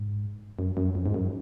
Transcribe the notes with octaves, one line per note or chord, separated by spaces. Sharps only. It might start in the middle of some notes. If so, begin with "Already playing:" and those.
Already playing: G#2
F#2
F#2
F2
G#2
F#2